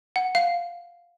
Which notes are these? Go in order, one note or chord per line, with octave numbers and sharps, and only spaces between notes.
F#5
F5